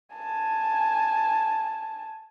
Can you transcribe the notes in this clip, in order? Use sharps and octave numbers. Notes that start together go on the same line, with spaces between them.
G#5 A5